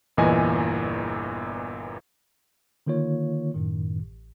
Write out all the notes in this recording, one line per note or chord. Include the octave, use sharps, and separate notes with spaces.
G1 E2 A#2 E3 D#5 G#5
D3 D#3 A#3 F4 C#5
F#2 A2 D#3
A1